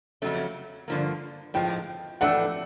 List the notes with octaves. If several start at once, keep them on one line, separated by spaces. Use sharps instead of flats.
F2 C#3 F#3 A3 C#4
G2 D3 F3 A#3
A2 F3 G#3 G5
A2 E3 A3 D4 F#5